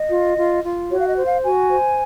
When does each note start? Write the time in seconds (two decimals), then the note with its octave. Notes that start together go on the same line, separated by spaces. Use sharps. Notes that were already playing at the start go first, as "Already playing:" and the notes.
Already playing: D#5
0.11 F4
0.37 F4
0.63 F4
0.90 F#4 C#5
0.99 F5
1.08 D#5
1.16 C5
1.25 F5
1.43 F#4 G#5
1.70 C5